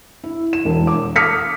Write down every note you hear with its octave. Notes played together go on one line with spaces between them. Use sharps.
E4
E7
E1
D6
D6 D#6 F6 B6 C#7